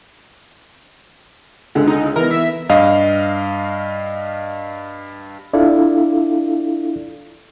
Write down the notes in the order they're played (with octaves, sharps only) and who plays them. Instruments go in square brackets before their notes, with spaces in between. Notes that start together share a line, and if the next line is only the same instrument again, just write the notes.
[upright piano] C#2 D3
[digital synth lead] D#4
[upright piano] E3 B3 [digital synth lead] A#4
[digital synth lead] E5
[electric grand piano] G2 D#5 F5
[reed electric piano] D4 E4 F4 A4 D5 F5